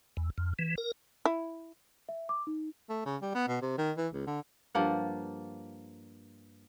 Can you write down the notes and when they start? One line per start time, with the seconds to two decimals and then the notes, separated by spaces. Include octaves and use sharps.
0.17 E2
0.38 F2
0.59 E3
0.78 A#4
1.25 E4
2.09 E5
2.29 D6
2.47 D#4
2.89 A3
3.05 C#3
3.22 G3
3.35 B3
3.48 B2
3.62 C3
3.78 D#3
3.97 E3
4.13 C#2
4.27 D3
4.75 G2 F3 A#3 F#5